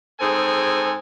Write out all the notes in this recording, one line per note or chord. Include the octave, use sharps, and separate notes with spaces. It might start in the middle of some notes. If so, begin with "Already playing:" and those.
G#2 C4 G#4 A4 G#5